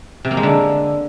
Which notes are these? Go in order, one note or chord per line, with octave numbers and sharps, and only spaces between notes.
C3
A#3
G#3
D3